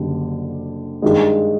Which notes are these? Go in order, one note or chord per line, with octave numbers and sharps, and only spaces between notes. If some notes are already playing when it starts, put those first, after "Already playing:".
Already playing: F#1 D3 G3
G2 D#3 G#3